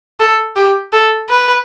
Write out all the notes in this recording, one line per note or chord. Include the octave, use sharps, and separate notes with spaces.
A4
G4
A4
B4